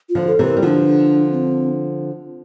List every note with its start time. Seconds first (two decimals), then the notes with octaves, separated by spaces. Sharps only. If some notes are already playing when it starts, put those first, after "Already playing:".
0.09 F4
0.15 D3 F3
0.27 A4
0.39 C3 E3
0.44 A#4
0.57 G3
0.62 D3 F3 D4 F4
1.32 C4